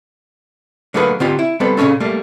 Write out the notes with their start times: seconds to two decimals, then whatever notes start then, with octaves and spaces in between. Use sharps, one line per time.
0.94 D3 F#3 A3 A#3 G#4 B4
1.20 D3 C4 F4 G4
1.39 E4
1.60 G3 B3 C4 A4 B4
1.77 A#2 C#3 A#3 C#4 A4
2.00 G3 A3 A#3